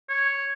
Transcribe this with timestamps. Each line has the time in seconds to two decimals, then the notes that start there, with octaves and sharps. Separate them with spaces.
0.09 C#5